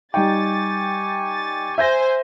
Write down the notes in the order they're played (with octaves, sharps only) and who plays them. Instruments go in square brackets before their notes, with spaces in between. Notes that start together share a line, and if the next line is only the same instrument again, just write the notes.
[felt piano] G3 D#4 G5 [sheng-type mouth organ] G4 G#5 C#6 [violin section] A6
[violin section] A6
[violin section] C5 G#5 [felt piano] E5 G6 A#6